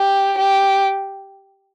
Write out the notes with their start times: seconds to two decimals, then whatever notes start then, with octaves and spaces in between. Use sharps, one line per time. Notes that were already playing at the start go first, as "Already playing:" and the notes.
Already playing: G4
0.37 G4